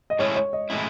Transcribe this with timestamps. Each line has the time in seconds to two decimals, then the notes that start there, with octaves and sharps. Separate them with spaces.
0.10 D#5
0.19 A2 G#3 C#4 E4 C#5
0.36 C#5
0.53 D#5
0.70 A2 G#3 C#4 E4